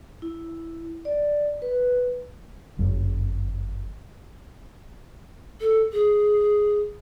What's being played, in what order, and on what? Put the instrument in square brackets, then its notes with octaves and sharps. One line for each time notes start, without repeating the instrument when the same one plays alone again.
[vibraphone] E4
D5
B4
[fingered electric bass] G1 F#2
[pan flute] A4
G#4